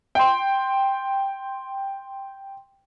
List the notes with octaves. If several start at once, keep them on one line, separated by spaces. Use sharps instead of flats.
G5 C6